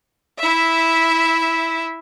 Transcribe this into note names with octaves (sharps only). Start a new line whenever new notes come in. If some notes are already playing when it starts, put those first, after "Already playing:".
E4 E5